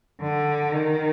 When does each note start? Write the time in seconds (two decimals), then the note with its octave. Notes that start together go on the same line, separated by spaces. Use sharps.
0.22 D3
0.72 D#3